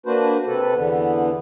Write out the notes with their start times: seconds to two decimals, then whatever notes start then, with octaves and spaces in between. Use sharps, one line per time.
0.06 A#3 D4 F#4 B4 C5
0.47 C3 A4 B4
0.74 E2 D3 B3